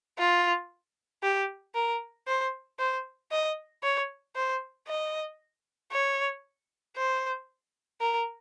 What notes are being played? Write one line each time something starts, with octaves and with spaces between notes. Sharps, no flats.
F4
G4
A#4
C5
C5
D#5
C#5
C5
D#5
C#5
C5
A#4